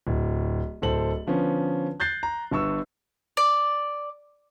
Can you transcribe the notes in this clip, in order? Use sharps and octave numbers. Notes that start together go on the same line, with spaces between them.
D1
D1 A4 C5 F#7
D3 F3 B3 C#4
F#6 G6 A6 C7
A#5
G1 G2 C#6 E6
D5